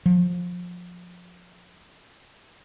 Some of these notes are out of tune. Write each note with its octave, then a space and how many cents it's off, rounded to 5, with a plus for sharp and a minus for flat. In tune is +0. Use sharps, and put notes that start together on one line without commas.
F3 +25